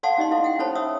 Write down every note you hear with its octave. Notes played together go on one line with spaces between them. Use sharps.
A4 D5 F5 F#5 A5 C6
C#4 D#4 G4 D5 D#5 C6
E4 A4 F5 C6
F#5 G5
C#4 A4 C5 C#5 A5 B5
C#5 E5 D#6 E6